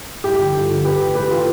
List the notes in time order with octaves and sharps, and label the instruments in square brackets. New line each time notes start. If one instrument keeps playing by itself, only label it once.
[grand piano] G2 E4 G4
D3 F3
G2 F4 A4
D3 F3
A2 G4 B4
E3
A2 G4 B4
E3 F4 A4